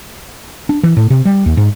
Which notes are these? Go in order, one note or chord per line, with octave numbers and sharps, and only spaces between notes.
D4
E3
A2
C3
G3
D#2
G#2